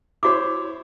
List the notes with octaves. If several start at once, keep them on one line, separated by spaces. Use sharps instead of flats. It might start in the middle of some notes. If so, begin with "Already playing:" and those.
E4 F#4 C5 C#5 D6